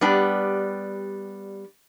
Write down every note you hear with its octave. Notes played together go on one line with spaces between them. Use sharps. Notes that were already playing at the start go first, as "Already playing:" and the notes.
G3 B3 D4 G4